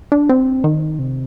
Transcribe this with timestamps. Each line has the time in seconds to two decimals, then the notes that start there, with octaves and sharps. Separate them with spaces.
0.12 D4
0.29 C4
0.64 D#3
0.99 C3